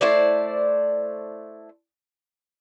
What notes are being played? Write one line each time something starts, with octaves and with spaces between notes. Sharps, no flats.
A3 E4 C5 D5